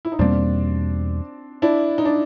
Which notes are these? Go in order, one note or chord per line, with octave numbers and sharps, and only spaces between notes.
E4
D#4
E2 B2 G3 A#3 C4 D4
D4 E4
D#4
D4